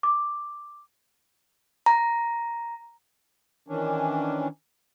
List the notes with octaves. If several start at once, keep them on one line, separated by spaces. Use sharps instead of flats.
D6
A#5
D#3 E3 C#4 D4